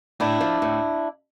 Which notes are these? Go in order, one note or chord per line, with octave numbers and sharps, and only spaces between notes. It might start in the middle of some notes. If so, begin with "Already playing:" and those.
A2 D4 E4
F3
A2